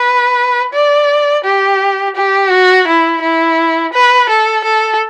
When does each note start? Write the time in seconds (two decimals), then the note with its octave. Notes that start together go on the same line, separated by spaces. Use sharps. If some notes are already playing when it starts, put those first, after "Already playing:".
Already playing: B4
0.73 D5
1.44 G4
2.15 G4
2.51 F#4
2.87 E4
3.21 E4
3.93 B4
4.29 A4
4.64 A4